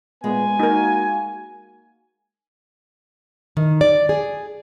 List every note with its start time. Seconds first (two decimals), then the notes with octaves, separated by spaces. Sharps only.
0.24 A#2 G#3 B3 G#5
0.60 A#3 D#4 F#4 A#4
3.57 D#3
3.81 D5
4.09 G#4